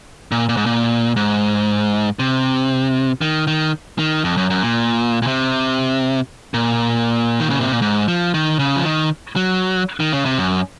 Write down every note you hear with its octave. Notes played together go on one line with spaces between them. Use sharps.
A#2
A#2
G#2
A#2
G#2
C3
D#3
D#3
D#3
F2
F#2
F#2
A#2
A#2
C3
A#2
D#3
C#3
C3
A#2
G#2
F3
D#3
C#3
F3
D#3
F#3
D#3
C#3
C3
F#2